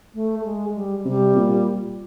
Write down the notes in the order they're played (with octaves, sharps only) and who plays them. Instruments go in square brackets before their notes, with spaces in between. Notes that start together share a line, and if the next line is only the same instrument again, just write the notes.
[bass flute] A3
G#3
G3
[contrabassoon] C3 [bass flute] G3
[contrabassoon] A#2